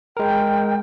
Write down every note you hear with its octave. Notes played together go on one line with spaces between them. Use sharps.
G#3 A#4 G5